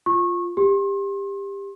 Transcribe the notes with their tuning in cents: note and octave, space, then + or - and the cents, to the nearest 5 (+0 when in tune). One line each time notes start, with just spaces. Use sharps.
F4 +0 C#6 -25
G4 +20 C6 +40